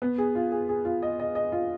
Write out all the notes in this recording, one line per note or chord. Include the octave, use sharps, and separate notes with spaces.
B3
G#4
F4
G#4
G#4
F4
D#5
D#5
D#5
F4